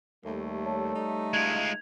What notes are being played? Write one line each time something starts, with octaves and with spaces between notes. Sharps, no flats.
D#2 G3 A3
C#5 A5
D#4
G#3 F4 G#6 F7